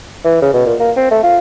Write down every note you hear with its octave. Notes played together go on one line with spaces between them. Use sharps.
E3
C#3
B2
A#2
A#3
C4
A3
F4